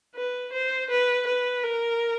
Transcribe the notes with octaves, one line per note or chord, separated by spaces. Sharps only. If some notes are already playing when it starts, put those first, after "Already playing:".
B4
C5
B4
B4
A#4